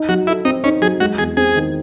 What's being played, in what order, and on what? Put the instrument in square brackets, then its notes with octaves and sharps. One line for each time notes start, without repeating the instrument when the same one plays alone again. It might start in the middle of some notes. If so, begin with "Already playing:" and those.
Already playing: [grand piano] D#4
[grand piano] F#3 [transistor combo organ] F#4
[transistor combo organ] E4 [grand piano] A4
[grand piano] C4 [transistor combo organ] D#4
[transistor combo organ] C#4 [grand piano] D#4
[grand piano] F#3 [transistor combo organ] G#4
[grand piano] G#3 [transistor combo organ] F#4
[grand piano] E2 [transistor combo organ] G#4
[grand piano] C4 [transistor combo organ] G#4
[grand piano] D#3